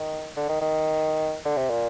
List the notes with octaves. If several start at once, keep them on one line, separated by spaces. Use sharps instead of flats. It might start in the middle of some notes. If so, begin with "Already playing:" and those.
Already playing: D#3
D3
D#3
D#3
D3
C3
A#2